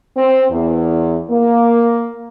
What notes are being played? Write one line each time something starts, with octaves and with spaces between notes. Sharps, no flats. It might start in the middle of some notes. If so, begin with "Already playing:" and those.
C4
E2
A#3